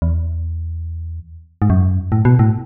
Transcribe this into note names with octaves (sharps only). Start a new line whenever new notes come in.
E2
G#2
F#2
A2
B2
A2